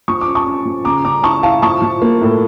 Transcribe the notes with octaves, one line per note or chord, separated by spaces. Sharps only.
F3 C#6
D6
C#4
A5 C#6
C#4
F3
C#3 A#5 D6
C#3 A#5 D6
E4 A5 C#6
E4 F5 A5
F3 A5 C#6
F3
A#3
A2